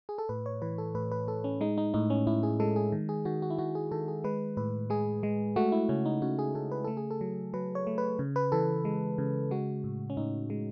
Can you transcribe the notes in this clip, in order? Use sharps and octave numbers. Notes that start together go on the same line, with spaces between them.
G#4
A4
A2 B4
C#5
E3 B4
A4
A2 B4
B4
A2 A4
C#4
G#3 D#4
D#4
A2 D#4
C#4
A2 E4
G#4
G#3 A4
G#4
D#3
G#4
D#3 F#4
F#4
E4
D#3 F#4
G#4
D#3 A4
G#4
G#3 B4
A2 B4
G#3 G#4
G#3
A3 F#4
E4
C#3 C#4
D#4
C#3 F#4
G#4
C#3 A4
B4
A3 A4
G#4
A4
F#3
F#3 B4
C#5
A3
B4
C#3
B4
E3 A4
G#3
C#3
G#3 F#4
A2
C#4
A2 D#4
G#3